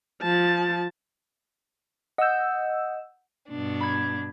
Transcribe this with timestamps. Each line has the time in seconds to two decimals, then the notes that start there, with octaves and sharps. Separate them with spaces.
0.22 F3 A5
2.18 D#5 F#5 E6 G6
3.50 G2 B2 D4
3.80 B5 G#6